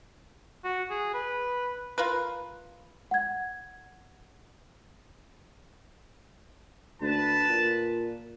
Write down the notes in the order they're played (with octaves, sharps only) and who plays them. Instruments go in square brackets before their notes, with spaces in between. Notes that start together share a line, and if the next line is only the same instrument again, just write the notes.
[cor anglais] F#4
G#4
B4
[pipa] F4 A#4 B4
[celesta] F#5 G#6
[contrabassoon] D2 [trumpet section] B4 A5
[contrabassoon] A#2